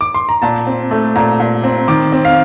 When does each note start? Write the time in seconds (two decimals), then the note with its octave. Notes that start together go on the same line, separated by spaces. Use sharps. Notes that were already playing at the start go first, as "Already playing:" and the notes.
0.01 D6
0.14 C6
0.29 A#5
0.42 A#2 A5
0.67 C4
0.91 A3
1.16 A#2 A#5
1.40 A#2
1.64 C4
1.88 D#3 D6
2.12 C4
2.25 F5